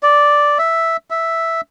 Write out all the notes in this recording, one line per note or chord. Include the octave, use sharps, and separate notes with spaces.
D5
E5
E5